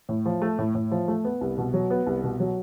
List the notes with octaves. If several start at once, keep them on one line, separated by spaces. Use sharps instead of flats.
A2
F3
A3
A2
A2
F3
A3
B3
C2
B2
F#3
B3
C2
B2
F#3